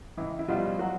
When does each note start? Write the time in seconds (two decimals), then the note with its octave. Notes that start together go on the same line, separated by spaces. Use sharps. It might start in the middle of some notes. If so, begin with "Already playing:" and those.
0.17 C#2 E3 E4
0.39 E4
0.48 B2 F3 G3 F4
0.79 F#3 F#4